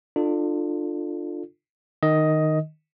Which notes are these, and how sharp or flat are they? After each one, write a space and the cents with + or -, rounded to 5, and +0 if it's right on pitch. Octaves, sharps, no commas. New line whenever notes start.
D4 +30 F4 +0 A4 +0
D#3 -10 D#5 +10